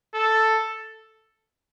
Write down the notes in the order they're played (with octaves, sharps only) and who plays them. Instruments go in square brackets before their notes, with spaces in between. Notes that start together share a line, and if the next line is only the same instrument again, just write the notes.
[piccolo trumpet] A4